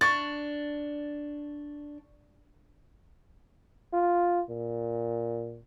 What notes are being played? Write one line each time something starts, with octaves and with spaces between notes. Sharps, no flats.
D4 C#6 A6
F4
A#2